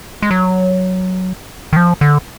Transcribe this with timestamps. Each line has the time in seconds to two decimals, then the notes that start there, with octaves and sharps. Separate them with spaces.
0.22 G#3
0.31 F#3
1.73 D#3
1.77 F3
2.01 D3